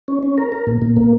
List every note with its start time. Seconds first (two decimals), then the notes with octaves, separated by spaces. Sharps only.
0.08 C#4
0.23 C#4
0.38 A#4
0.52 A#4
0.67 A#2
0.82 A#2
0.96 A#3